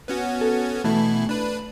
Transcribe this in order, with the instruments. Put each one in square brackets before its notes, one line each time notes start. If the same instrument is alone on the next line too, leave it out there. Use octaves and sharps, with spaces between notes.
[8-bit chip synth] B3 C#4 F#4
[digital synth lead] A4
[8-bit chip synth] B2 E3 E4 [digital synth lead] A3
[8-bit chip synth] D4 B4